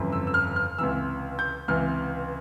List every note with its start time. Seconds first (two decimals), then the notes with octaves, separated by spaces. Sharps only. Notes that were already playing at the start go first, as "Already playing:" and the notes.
Already playing: G1 F2 C#3 E3
0.12 E6
0.27 E6
0.34 F6
0.56 F6
0.78 C#2 C3 E3 E6
1.39 G6
1.68 C#2 C3 E3 F6